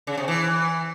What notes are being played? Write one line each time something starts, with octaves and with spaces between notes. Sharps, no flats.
C#3
C3
E3